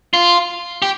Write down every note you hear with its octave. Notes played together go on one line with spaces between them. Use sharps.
F4
G4